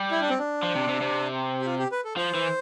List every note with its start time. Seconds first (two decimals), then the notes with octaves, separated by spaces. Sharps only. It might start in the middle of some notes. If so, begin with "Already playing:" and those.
Already playing: G3
0.11 E4
0.20 D4
0.30 C4
0.39 D4
0.63 F3
0.75 C3
0.88 C3
1.01 C3
1.61 G4
1.66 F4
1.79 G4
1.92 B4
2.04 A4
2.17 F3 C5
2.35 E3